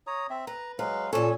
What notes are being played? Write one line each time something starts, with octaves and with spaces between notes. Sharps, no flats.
C#5 A#5 D#6
C4 E5
B4 A#5
F#3 G#3 B4 F5
A#2 C#4 A4 C#5 G#5